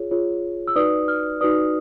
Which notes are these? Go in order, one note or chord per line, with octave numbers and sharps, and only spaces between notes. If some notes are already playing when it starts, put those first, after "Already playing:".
Already playing: F4 G#4 C#5
F4 G#4 C#5
E6
D#4 F#4 B4 D5 D#6
F6
D#4 F#4 B4 D5 D#6